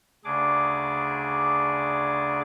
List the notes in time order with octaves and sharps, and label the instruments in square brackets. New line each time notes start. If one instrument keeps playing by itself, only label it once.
[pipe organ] D2 C#3 D4 G#4 D6